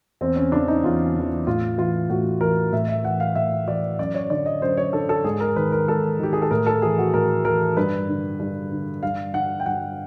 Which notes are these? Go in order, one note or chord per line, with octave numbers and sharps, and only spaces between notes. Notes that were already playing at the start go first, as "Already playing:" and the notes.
E2 C4
C#4
C#3 E3 D4
D#4
E2 F4
C#3 E3
A2 F4
E3 F4
A2 F#4
E3 A#4
A2 E5
E5
E3 F#5
F5
A2 E5
E3 D5
F#2 D5
C#5
D3 D5
D#5
F#2 C5
C#5
D3 A4
A4
G#2 G#4
A#4
D#3 B4
A#4
G#2 A4
D#3 G4
G#4
A4
A2 A#4
A4
E3 G#4
F#4
A2 A#4
E3 A#4
G2 B4
D3
G2
D3
G2 F5
D3 F#5
G5
G2 F#5